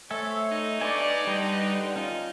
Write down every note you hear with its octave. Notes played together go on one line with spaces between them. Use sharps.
A3 A4 C5 C#5 E5 G#5
D#4
D4 B4 D5 G#5 C#6
D3 G3 B4 D#5 G5
C#4 D#4 F4